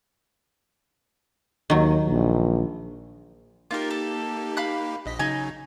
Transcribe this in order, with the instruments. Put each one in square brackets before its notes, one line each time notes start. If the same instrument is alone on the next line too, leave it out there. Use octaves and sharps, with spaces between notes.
[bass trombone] D#2 [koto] D#3 F#3
[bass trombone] A#1
[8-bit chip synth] A#3 D#4 G4 [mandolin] F4 A#4
[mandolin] A4
F5 B5 F#6
[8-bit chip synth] A#1 D#5 B6
[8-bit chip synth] C#3 F#3 D#4 [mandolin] C#5 D#5 G#5